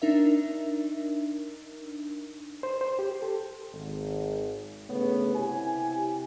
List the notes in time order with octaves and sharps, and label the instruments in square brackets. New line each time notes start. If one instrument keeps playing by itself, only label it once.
[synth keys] D4 D#4 A#4 E5
[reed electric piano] C5
C5
G4
A4
[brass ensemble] G#1
G1 C#3 A3 B3 B4 C#5
C3 E4 G4 G#5